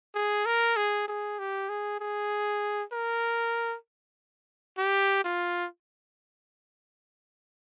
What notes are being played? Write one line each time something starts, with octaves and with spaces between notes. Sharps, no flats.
G#4
A#4
G#4
G#4
G4
G#4
G#4
A#4
G4
F4